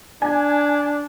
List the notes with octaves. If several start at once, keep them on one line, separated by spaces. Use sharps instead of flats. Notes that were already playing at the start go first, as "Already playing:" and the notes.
D4 G#5